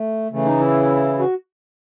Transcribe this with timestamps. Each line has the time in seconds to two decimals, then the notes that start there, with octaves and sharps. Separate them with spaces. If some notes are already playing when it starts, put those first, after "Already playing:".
Already playing: A3
0.32 C#3 E3 A3
0.46 D#4
0.60 E4
1.19 F#4